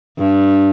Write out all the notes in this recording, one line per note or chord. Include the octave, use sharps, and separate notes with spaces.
G2